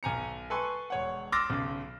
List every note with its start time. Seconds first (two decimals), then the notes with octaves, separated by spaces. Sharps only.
0.03 B1 G#5 A#5 C#7
0.50 A4 B4 G#5 C6 C#6
0.90 E1 C#5 F#5
1.32 C6 D6 E6 F6 A6 A#6
1.50 B1 C#3